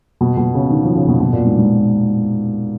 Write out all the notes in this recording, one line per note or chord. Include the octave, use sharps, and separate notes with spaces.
B2
B2
C#3
D#3
F3
C#3
B2
B2
A#2
G#2
G#2